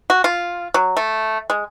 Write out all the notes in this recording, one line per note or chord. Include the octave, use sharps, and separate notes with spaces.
F#4
F4
F#3
A3
G#3